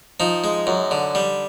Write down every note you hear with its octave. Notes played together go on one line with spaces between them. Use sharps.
F3 D#4
G#3
F#2
D3
G3